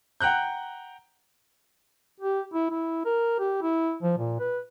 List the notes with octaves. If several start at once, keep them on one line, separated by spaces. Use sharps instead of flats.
F#5 G5 A#5 F#6 G6
G4
E4
E4
A#4
G4
E4
F3
A#2
B4